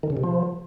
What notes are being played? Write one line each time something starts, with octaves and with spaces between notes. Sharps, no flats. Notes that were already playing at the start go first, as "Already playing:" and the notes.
D#3
C#3
C3
F3